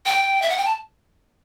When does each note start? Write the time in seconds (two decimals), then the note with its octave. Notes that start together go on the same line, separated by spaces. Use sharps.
0.06 G5
0.42 E5
0.50 F#5
0.57 G5
0.65 A5